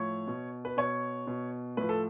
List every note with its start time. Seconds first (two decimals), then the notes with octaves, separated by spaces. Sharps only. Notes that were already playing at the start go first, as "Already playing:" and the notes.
Already playing: A2 F3 C#5
0.27 B2
0.65 B4
0.77 B2 C#5
1.27 B2
1.77 A2 F3 B4
1.89 A4